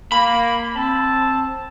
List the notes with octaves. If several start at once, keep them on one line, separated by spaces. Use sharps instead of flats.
A#3 B5
C4 A5